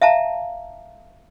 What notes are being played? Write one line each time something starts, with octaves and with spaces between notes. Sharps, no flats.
E5 F5 A5 A#5